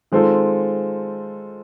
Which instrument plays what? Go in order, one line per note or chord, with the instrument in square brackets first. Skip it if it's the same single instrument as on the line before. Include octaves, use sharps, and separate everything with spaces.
[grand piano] D#3 G#3 C4 F4 A4